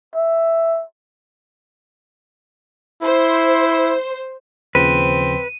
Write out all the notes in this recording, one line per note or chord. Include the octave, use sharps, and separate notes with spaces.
E5
E4 C5
D#2 C#3 F3 C4 B4 D#7